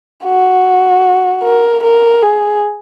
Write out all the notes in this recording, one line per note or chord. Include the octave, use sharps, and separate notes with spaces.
F#4
A#4
A#4
G#4